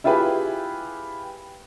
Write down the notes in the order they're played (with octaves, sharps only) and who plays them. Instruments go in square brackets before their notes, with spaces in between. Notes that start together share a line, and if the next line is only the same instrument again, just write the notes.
[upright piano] E4 F4 G4 G#4 B4